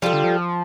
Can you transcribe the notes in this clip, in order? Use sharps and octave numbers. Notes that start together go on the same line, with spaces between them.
F3 G3 F4 A4
D3
F3